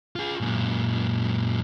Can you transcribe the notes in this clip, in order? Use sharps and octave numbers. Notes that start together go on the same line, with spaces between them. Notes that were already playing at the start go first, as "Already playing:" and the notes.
F4 G#4
F#2 A#2